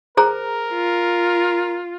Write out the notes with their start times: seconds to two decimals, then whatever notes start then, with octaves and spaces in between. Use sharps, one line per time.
0.17 G#4 A#4 C5 A#5
0.71 F4